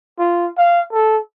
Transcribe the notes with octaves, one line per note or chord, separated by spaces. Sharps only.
F4
F5
A4